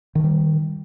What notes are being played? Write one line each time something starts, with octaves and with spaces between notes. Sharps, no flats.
D#3 F3 G3